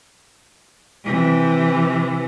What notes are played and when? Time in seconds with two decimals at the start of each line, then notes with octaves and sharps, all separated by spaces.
1.04 C3 E3